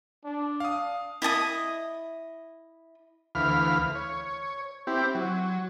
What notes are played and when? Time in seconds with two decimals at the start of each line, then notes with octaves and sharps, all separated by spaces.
0.25 D4
0.60 F5 D#6
1.22 E4 D#5 A5 D#6
3.35 D2 E3 F5 B5 F6
3.95 C#5
4.87 C4 E4 G4
5.15 F#3